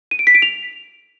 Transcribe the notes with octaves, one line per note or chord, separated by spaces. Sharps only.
D#7
D7
B6
D7
F7